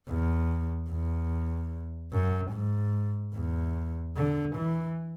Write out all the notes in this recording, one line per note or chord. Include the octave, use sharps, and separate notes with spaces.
E2
E2
F#2
G#2
E2
D3
E3